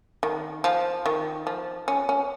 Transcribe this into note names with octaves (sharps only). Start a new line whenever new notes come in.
D#3
F3
D#3
F3
C#4
C#4